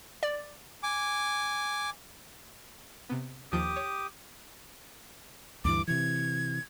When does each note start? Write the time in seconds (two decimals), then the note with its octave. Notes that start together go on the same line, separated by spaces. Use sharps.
0.23 D5
0.83 G#5 D6
3.10 C3 B3
3.52 D#2 F3 G4 D6 D#6 G6
3.76 C#5
5.65 D2 G2 E3 D6
5.88 C3 E3 G#6